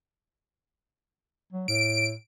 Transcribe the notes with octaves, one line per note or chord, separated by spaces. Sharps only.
F#3
A2 D7